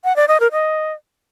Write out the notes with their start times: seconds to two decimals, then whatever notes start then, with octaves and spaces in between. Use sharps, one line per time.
0.04 F#5
0.16 D5
0.28 D#5
0.40 A#4
0.52 D#5